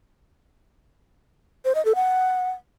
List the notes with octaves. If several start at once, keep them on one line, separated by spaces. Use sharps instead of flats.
C5
D#5
A4
F#5